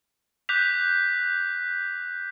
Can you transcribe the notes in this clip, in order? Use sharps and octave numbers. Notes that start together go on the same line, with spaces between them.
D6 F#6 G6 B6 F7